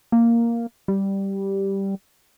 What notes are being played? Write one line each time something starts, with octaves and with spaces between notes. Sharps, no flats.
A#3
G3